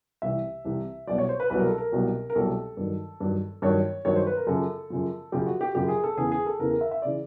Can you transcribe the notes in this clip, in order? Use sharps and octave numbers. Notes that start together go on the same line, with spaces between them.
C2 C3 E3 E5
C2 C3 E3
C2 B2 F#3 D5
C#5
C5
B4
C2 B2 F#3 B4
A#4
A4
A#4
C2 B2 F#3
A#4
C2 B2 F#3 A4
G2 D#3 F#3
G2 D#3 F#3
G2 D#3 F#3 C#5
G2 D#3 F#3 C#5
C5
B4
A#4
F#2 C#3 F3 A4
F#2 C#3 F3
F#2 C#3 F3 G4
F#4
G4
F#2 C#3 F3 G4
G#4
A4
E2 C#3 E3 G#4
G#4
A4
E2 C#3 E3 A#4
A#4
E5
E5
C#3 E3 D5